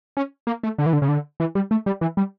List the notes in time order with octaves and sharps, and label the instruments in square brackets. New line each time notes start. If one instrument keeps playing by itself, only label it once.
[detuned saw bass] C#4
A#3
A3
D3
E3
D3
C#3
D3
E3
G3
A3
G3
E3
G3